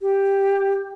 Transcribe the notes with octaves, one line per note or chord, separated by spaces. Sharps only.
G4